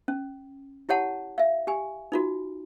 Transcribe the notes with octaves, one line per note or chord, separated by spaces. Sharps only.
C#4
E4 G4 C#5 F#5 A5
E5 F5
G4 G#5
D#4 F4 F#4